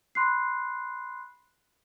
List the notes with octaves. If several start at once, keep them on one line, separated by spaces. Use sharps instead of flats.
B5 C6 F#6 C7